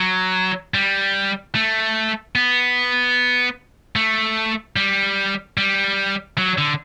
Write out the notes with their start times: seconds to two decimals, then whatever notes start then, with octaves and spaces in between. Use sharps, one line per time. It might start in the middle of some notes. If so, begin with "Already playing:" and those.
Already playing: F#3
0.74 G3
1.55 A3
2.36 B3
3.96 A3
4.76 G3
5.58 G3
6.38 F#3
6.58 D3